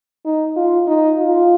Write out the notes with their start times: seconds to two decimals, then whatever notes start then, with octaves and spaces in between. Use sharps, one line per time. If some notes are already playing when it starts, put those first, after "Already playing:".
0.25 D#4
0.56 F4
0.88 D#4
1.19 F4